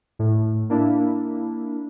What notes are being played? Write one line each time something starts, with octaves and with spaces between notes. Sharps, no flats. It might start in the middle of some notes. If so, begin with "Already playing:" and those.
A2
A#3 D4 E4